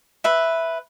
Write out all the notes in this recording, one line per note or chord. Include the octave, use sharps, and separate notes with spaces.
B4 E5